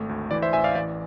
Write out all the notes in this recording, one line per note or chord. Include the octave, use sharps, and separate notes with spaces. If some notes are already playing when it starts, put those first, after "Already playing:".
Already playing: G#1 A3
D2
E3 D5
C5 E5
A1 E5 G#5
D5 F5
E3 D5